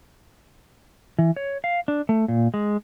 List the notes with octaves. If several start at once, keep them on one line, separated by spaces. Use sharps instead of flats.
E3
C#5
F5
D4
A3
A#2
G#3